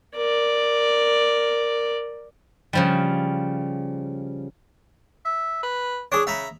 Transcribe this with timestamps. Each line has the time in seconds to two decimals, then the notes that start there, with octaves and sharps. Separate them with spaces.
0.16 A#4 D5
2.73 C#3 F3 G3
5.25 E5
5.63 B4
6.12 D4 G#4 C#5
6.27 C#3 E5 A#5 B5